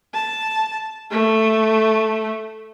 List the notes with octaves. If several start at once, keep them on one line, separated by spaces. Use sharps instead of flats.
A5
A3